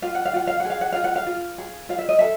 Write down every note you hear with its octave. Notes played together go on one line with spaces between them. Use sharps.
F4 F5
F#5
F5
F4 F#5
F5
F#5
G#4
F5
F#5
F4 F5
F#5
F5
F4
G#4
F4 F5
E5
D#5
A4 E5